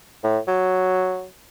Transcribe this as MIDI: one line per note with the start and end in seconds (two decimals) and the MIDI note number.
0.24 0.39 45
0.48 1.26 54